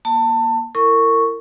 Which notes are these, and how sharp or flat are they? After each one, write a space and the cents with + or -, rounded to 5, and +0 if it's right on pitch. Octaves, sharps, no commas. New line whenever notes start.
A#3 +30 A5 +25
E4 +20 A#4 -35 C#6 +0